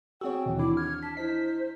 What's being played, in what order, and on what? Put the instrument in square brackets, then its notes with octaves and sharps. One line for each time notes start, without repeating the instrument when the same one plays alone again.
[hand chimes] C4 E6 [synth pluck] F#4 G#4 C#5 [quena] G5
[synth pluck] D#2 E3 [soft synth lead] B2
[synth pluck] D4 [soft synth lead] E4 [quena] D6
[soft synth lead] F6 [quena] G#6
[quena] A5 [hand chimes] B6
[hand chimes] E4 D#5 [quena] C5 [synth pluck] B6